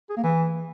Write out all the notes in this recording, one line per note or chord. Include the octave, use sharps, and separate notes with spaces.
G#4
A#3
E3